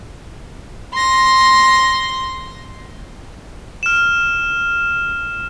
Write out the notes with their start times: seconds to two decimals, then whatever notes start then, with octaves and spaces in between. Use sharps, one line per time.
0.93 C6 A#6
3.83 F6 E7